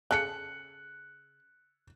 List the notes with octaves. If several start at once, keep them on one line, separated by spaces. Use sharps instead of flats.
C#3 A4 F#6 C#7